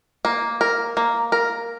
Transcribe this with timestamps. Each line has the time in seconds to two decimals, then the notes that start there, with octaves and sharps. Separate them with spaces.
0.25 A#3
0.61 A#4
0.97 A#3
1.32 A#4